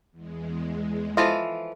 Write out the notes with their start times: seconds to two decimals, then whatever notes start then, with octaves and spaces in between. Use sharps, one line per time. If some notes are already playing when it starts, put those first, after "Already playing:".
0.12 E2 G#3
1.17 E3 F3 F4 A4 D#5 E5